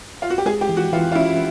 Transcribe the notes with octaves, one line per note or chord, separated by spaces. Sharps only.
F4
F#4
G4
G#3 G#4
G4
E3
F#4
E3 F4
F4
C#4 E4